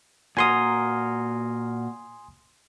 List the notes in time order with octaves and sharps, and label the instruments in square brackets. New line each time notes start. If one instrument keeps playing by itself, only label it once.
[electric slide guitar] A#2 F#4 A#4 [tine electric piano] G#5 C6 D#6